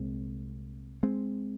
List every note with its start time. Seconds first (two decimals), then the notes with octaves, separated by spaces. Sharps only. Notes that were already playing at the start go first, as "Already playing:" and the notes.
Already playing: C2 A#2 G#3 C4
1.03 G#3 C4